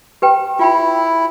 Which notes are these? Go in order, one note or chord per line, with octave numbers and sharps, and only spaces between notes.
G4 B4 G5
E4 F4 G5 B5